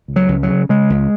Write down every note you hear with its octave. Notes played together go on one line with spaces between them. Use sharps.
C#2
F#3
C#2
F#3
C#3
C#3 G#3
C#2